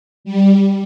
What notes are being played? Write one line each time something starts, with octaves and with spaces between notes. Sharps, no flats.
G3